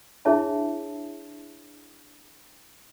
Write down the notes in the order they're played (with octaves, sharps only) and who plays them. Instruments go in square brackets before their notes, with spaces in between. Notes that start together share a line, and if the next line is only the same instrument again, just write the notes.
[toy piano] D4 E4 G#4 C#5 E5 A5